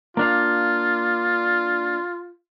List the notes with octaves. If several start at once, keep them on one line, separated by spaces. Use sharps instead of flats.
A#3 D4 F4 F5